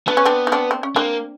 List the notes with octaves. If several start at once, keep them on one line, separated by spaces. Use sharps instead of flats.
B3 D4
C#4
C4 D4
D#4
C4 D4
C4
C#4
A#3 C4 D4